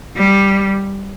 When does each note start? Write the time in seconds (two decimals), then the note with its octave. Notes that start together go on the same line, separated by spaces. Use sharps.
0.16 G3